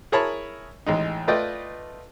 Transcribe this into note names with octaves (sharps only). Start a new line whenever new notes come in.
E4 G#4 A#4 C#5 A5 B5
A1 G#3 D#4
A3 F4 B4 D5 D#5 G5